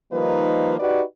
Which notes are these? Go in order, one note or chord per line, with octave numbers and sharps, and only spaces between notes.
D#3 F3 G3 A#3 D#4 B4
D#4 F#4 G4 B4 D5